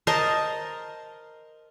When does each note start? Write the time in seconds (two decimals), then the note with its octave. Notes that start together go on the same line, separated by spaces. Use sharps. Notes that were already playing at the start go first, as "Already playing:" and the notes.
0.07 A#4 C5 D#5 A5